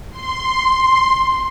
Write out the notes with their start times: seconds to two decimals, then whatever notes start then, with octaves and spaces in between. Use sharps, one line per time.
0.11 C6